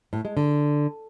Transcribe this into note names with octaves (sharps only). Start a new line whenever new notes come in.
A2
G#3
D3